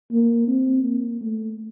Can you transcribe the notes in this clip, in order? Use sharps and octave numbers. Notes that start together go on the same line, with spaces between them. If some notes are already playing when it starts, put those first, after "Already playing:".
A#3
C4
A#3
A3